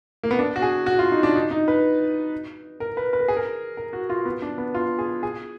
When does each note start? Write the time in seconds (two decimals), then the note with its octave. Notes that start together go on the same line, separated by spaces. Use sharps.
0.23 A#3
0.31 B3
0.39 D4
0.56 F#4
0.62 G#4
0.86 F#4
0.99 F4
1.12 D#4
1.23 D4
1.36 D#4
1.51 D#4
1.68 B4
2.80 A#4
2.97 B4
3.13 B4
3.21 A#4
3.28 G#4
3.36 A#4
3.77 A#4
3.93 F#4
4.10 F4
4.25 B3
4.42 D4
4.58 B3
4.74 F4
4.99 G#4
5.23 G#4